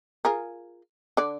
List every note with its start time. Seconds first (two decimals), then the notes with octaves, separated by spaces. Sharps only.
0.25 F4 G#4 A#4
1.17 D3 D5